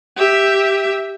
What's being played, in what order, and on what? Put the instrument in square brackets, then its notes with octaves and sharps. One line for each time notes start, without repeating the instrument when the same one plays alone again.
[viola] G4 E5